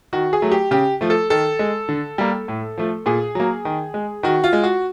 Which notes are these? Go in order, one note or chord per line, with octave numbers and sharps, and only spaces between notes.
D#3 F#4
G#4
F#3 A3
G4
C#3 G4
F3 A3
A4
D#3 A4
G#3
D3
G3 A#3
A2
F3 A3
A#2 G#4
F#3 A#3
D#3
G#3
D#3 F#4
F4
G#3
F#4